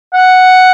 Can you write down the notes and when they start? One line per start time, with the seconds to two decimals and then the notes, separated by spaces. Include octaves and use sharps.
0.14 F#5